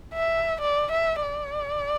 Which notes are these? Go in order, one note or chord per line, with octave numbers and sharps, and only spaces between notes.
E5
D5
E5
D5